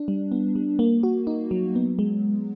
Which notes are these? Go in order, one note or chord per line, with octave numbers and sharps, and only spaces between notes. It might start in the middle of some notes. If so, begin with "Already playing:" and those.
Already playing: D4
G3
B3
G3
A#3
F#4
D#4
F#3
B3
G#3